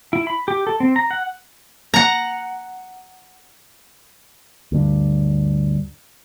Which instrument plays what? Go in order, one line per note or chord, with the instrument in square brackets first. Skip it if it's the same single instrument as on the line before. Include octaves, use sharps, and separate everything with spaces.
[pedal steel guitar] E4
B5
G4
A4
C4
A#5
F#5
[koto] F#5 A#5
[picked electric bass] D2 G2